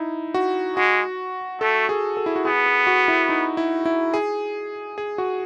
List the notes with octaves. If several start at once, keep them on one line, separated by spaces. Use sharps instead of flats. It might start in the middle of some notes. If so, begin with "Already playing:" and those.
Already playing: D#4 E4
F#4
G#3 F#4
A3 A4
G#4
A4
E4
F#4
B3 G#4
G#4
F#4
E4
D#4
E4
E4
G#4
G#4
F#4